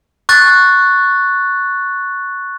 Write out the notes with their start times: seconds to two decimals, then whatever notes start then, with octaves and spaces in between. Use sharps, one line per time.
0.29 C#6 F#6 A6